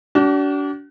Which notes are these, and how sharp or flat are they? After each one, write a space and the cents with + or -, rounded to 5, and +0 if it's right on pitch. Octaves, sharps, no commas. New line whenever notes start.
D4 -35 F#4 +40